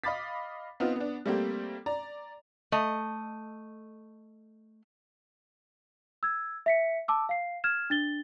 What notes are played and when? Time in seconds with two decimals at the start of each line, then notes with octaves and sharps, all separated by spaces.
0.04 D#5 F5 B5 D6 A6 B6
0.80 B3 C4 D#4 F4
0.96 B3 D4
1.26 G3 A3 A#3 C4 G4
1.86 D5 A#5
2.72 A3 D#5
6.23 E6 G#6
6.66 E5 B6 C#7
7.08 A5 D6 E6
7.29 F5 C7
7.64 F6 G#6 E7
7.90 D4 A6 G7